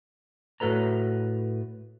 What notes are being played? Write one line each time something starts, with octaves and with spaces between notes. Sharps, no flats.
A2 F#4 A4 B4 A#5